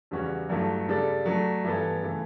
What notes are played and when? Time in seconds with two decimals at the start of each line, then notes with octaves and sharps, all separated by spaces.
0.11 E2 C#3 G3 C#4 F#4
0.49 G2 F#3 A3 E4
0.88 C#3 G3 D4 A4
1.25 F#3 A3 D4
1.64 G2 E3 B3 E4 A4
2.02 C#3 E3 A3